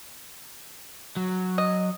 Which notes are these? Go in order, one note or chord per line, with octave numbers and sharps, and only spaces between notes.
F#3
D#5